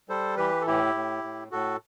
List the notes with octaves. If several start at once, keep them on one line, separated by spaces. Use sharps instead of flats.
G3 A4 C5
E3 G4 B4
A4
A2 E4 G4
A2
A2
A2 F#4 A4